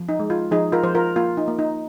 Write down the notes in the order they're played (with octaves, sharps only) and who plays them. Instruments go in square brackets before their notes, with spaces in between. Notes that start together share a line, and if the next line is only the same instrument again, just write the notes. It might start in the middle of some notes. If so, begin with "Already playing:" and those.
Already playing: [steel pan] F3
D#4
G#3
F4
F3 D#4 G#4
F4 A#4
F3 C5
F4 A#4
A#3 F4
D#4
A#3
D#4